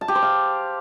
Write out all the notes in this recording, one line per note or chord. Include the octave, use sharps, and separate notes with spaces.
A5
G4
C5
F5